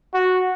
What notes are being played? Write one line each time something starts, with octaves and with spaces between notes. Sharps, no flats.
F#4